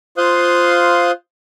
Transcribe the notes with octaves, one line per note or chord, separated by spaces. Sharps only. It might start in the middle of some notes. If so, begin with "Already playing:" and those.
F4 C5 F5 C6 D#6 F#6